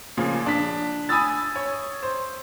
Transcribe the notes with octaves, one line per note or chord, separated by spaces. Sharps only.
A#2 C#3 F3
D4 B6
G#5 B5 D#6 E6 A6
C#5
C5